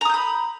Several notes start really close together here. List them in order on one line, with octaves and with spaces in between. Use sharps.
A#5 D#6 G6 B5